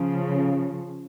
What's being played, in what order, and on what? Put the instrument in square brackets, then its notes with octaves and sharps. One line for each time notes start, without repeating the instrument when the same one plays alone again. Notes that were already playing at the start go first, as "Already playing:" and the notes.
Already playing: [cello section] C#3 F3